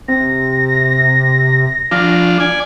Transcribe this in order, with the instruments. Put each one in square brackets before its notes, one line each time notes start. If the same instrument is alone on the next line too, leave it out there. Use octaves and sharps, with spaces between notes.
[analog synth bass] C3 [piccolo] A#6
[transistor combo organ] F3 D4 F4
D5 G#5